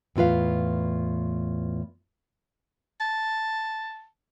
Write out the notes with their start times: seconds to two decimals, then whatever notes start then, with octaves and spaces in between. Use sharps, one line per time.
0.16 E2 A2 F4 B4 F5
3.01 A5